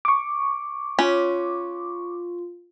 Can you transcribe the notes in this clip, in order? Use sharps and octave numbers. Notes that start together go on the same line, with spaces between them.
C#6 D6
C#4 F4